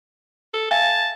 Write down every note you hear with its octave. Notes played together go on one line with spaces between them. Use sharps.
A4
E5 F5 G#5 A5